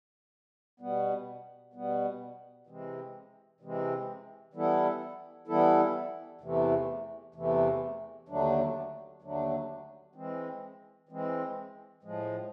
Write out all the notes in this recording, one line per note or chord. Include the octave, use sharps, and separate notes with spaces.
B2 G3 B3
B2 G3 B3
C3 E3 G#3 C4
C3 E3 G#3 C4
E3 G3 B3 E4 A4
E3 G3 B3 E4 A4
E2 C3 E3 A3
E2 C3 E3 A3
D#2 D3 F#3 A3 D4
D#2 D3 F#3 A3 D4
E3 G#3 C4
E3 G#3 C4
A2 F3 G#3